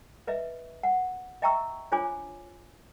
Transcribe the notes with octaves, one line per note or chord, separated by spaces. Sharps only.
B4 D#5 E5
F#5
D#5 E5 G5 A#5 C#6 E6
D4 F4 C5 C#5 G#5 D6